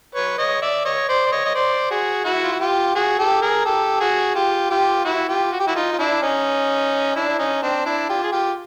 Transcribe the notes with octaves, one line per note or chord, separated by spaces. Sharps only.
B4 C#5
C#5 D#5
D5 E5
C#5 D#5
C5 D5
D5
C#5 D#5
D#5
C5 D5
F#4 G#4
E4 F#4
F4
F#4
F4 G4
F#4 G#4
G4 A4
G#4 A#4
G4 A4
F#4 G#4
F4 G4
F4 G4
E4 F#4
F4 G4
F#4
G4
E4 F#4
D#4 F4
F4
D4 E4
C#4 D#4
D4 E4
E4
C#4 D#4
C4 D4
D4 E4
F4 G4
G#4
F4 G4